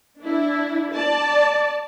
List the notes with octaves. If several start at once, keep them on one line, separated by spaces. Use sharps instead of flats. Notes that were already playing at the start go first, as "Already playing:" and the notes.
D4 E4
D5 A5